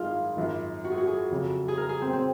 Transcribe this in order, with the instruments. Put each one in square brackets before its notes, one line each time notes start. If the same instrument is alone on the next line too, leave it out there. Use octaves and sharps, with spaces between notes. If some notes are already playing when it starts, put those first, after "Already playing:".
Already playing: [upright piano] G#1 F#2 D#3 G#3 D#4 [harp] F4 G#4
[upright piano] G#1 F#2 F3
[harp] F#4
G#4
F#4
G#4
[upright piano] F2 C#3 F#3
[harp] G#4
A#4
G#4
C4
C4